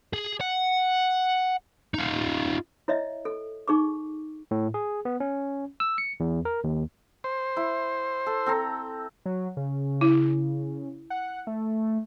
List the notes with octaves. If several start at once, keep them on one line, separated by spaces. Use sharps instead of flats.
G#4
F#5
D#4 F4
E4 C#5 D#5 E5
A4
D#4 G#4 C#6 D6
A2
G#4
B3
C#4
E6
C#7
E2
A#4
D#2
C5
E4 B5
A4
C4 A4 A#5
F#3
C#3
E4
F#5
A3